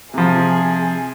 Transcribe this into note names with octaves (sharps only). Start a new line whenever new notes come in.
C3 F3 G#4